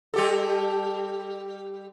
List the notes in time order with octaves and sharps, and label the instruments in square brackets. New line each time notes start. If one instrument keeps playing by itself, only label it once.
[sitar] G3 G4 A4